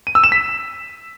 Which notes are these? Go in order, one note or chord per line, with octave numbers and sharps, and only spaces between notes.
D#7
E6
E7
B6